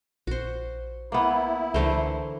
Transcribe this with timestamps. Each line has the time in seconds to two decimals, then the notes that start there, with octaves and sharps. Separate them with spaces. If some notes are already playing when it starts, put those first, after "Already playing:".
0.27 A#1 F#4 C5
1.12 A#3 B3 E4
1.74 C#2 D3 E3 A3 A#4 C5